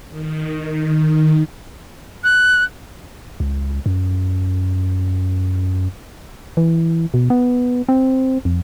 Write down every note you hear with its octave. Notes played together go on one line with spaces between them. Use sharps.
D#3
F#6
C#2
F#2
E3
B2
B3
C4
F2